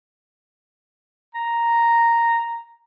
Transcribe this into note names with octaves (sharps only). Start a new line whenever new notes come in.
A#5